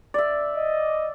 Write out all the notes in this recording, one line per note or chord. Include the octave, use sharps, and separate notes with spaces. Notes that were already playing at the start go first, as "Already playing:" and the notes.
D5 E5
D#5